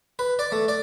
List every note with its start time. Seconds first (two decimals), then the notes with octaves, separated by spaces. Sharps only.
0.19 B4
0.39 D5
0.52 A3
0.68 D5